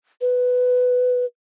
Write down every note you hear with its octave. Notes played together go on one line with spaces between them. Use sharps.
B4